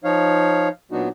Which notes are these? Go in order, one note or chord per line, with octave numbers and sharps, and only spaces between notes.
F3 D#4 C#5 F5
A#2 F#3 B3 D4 D#4 F#4